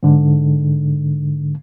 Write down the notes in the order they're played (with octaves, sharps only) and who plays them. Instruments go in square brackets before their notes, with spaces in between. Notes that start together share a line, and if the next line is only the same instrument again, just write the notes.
[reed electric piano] G#2 D3